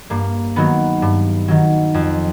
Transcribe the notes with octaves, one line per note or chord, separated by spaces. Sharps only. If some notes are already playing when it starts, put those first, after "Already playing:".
G2 A#3
D#3 F#3 B3
G2
D#3 F#3
F2